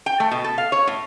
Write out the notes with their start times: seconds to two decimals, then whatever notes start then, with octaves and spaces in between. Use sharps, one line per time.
0.06 G5
0.20 A3
0.31 B2
0.44 A4
0.58 F5
0.72 C#5
0.87 A2